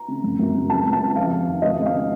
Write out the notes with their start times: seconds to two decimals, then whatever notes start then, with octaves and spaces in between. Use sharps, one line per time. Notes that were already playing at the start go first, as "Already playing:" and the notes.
Already playing: A#5
0.08 C#3
0.24 F#2
0.39 F#2
0.54 C#3
0.69 C#2 A5
0.85 C#2
0.93 A5
1.00 C#3
1.16 F2 F5
1.32 F2
1.46 D#3
1.62 C#2 D#5
1.78 C#2
1.86 F5
1.93 C#3